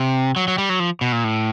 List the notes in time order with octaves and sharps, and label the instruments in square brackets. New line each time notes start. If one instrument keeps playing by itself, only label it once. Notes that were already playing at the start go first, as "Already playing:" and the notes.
Already playing: [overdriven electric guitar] C3
F#3
F#3
G3
F#3
F3
B2
A#2
A2